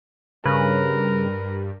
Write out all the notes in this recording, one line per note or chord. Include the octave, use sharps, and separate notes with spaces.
G2 C#3 G3 A#4 B4